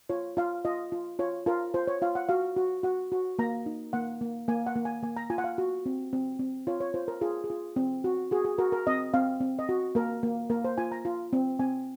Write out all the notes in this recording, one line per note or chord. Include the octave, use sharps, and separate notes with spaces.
F4 C#5
F4 F5
F4 D#5
F4
F4 C#5
F4 A#4
F4 C5
C#5
F4 F5
F#5
F#4 F5
F#4
F#4 F#5
F#4
A#3 A#5
D#4
A#3 F#5
A#3
A#3 G#5
F#5
A#3
G#5
A#3 G#5
A#5
F4 G#5
F#5
F5
F#4
C4
C4
C4
F4 C#5
C#5
F4 C5
A#4
F4 G#4
G#4
F4
C4
F#4
F#4 G#4
G#4
F#4 A#4
A#4
C4 D#5
C4 F5
C4
D#5
F#4
A#3 A#4
A#3
A#3 A#4
C5
F4 G#5
A#5
F4
C4
C4 G#5